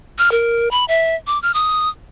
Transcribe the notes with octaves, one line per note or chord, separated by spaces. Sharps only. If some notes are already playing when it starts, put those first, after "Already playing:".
F6
A#4
B5
E5
D6
F6
D#6